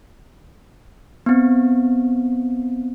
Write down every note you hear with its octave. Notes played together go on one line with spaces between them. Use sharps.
B3 C4